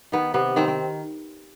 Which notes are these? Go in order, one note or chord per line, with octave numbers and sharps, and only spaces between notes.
D#3 B3
C3 B3
D#3 C4
C4